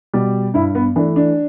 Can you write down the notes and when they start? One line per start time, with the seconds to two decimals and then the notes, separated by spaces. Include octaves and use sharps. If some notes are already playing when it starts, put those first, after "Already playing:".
0.14 B2 G3
0.54 G2 E4
0.75 B3
0.96 E3 A3 D4
1.16 D4